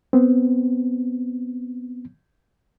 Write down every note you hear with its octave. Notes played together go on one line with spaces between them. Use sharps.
B3 C4